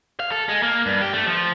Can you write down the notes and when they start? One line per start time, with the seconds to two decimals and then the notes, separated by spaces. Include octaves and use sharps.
0.20 F5
0.32 A4
0.49 G#3
0.63 A#3
0.86 G2
1.01 G4
1.13 A3
1.26 F3